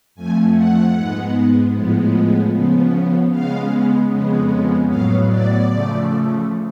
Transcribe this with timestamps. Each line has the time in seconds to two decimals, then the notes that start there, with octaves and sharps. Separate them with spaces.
0.15 F2 F3 A3 G#5
0.54 F#5
0.94 G#2 G#3 B3
1.73 A2 F3 G#3 B3
2.52 C#3 F3 B3
3.30 C#3 G#3 B3 F5
4.09 F2 C#3 G#3 B3
4.88 A2 F#3 B3 F5
5.28 D5
5.67 C#3 F3 A3